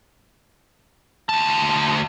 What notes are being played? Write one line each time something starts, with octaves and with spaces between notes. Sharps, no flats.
D2 A5